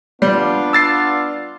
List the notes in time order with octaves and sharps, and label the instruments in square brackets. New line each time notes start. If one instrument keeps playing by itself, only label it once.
[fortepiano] G3 [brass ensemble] B3 D4 F4
[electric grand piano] E6 A6 C7